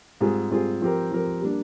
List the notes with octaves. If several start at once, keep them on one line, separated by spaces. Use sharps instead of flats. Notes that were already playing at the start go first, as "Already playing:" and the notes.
G#2 G3 C4 F4 G#4
G#2 G3 C4 F4 G#4
F3 C4 G4 A#4
F3 C4 G4 A#4
G3 A#3 D4